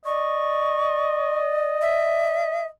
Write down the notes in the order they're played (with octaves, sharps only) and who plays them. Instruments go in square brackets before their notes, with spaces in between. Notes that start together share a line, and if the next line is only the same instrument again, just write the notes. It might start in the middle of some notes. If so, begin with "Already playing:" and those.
[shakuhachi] D5 [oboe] D#5 [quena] C#6
[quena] E5